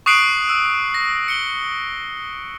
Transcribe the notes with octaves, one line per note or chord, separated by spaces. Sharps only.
C#6 D#6 F#6 C7 D7 F#7
E6
A#6
C#7 G7